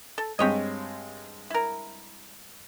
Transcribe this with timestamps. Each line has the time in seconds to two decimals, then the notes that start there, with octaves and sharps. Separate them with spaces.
0.18 A4
0.39 G2 G#3 C4 G4 C#5 D#5
1.50 E4 A#4